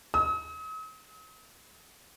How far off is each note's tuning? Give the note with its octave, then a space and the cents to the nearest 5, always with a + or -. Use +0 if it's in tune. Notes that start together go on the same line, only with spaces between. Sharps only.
D#6 +45